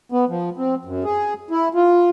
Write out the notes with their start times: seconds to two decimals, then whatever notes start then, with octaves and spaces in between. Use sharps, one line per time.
0.12 B3
0.29 F3
0.57 C4
0.85 F#2
1.04 G#4
1.51 E4
1.75 F4